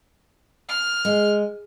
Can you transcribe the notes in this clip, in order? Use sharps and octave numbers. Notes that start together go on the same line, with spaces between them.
F6
G#3